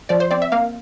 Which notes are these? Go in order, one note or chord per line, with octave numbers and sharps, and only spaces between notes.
F3 D5
C5
C4 D5
E5
A#3 F5